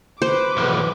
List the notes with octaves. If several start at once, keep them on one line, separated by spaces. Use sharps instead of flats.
B4 C5 D6
B1 E2